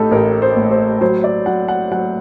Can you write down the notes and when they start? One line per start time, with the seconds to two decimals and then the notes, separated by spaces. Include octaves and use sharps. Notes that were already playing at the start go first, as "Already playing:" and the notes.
Already playing: A1 A2 D#4 G4 A4
0.11 A1 A#4
0.42 C5
0.56 A2
0.71 C5
1.01 F#3 C5
1.24 D5
1.46 F#3 F#5
1.68 F#5
1.92 F#3 F#5